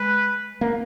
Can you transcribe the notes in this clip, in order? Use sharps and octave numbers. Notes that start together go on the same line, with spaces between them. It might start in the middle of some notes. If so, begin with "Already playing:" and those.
Already playing: G#3 B4
A#3